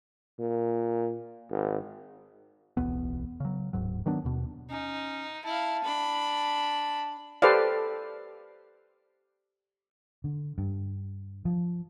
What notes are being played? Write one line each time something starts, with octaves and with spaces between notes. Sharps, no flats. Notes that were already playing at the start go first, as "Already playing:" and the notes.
A#2
G#1
D1 B1 E2 B3
C#3 F#3
D1 G#2 F#3
D#3 F#3 B3 D4
D#2 B2
C#4 D#4
E4 F5 A5
D4 B5
G4 A4 B4 C5 D5 F5
D3
G2
F3